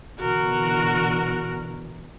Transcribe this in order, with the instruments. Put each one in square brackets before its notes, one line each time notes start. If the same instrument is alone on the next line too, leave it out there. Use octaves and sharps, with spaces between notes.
[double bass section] B2 D3 E3 [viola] F#4 A#4